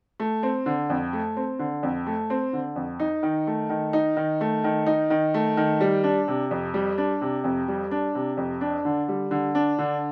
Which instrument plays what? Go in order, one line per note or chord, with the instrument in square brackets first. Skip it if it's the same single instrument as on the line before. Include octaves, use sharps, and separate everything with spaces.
[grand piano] A3
C4
D3
F2
A3
C4
D3
F2
A3
C4
D3
F2
D#4
D#3
A3
D#3
D#4
D#3
A3
D#3
D#4
D#3
A3
D#3
G3
D4
C3
F2
G3
D4
C3
F2
G3
D4
C3
F2
D4
D3
G3
D3
D4
D3